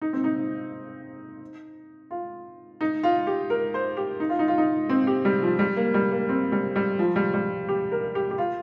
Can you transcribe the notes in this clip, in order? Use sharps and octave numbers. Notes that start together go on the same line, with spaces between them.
D#4
C4
D#4
F4
D#4
F4
G4
A#4
C5
G4
D#4
F4
D#4
F4
D#4
C4
G4
G3
F3
G3
A#3
G3
A#3
C4
G3
G3
F3
G3
G3
G4
A#4
G4
G4
F4